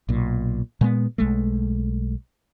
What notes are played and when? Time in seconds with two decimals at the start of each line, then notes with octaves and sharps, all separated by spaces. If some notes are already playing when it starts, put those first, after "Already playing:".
0.09 B1 A#2
0.81 A#2 G#3 B3
1.18 B1 G#3 A3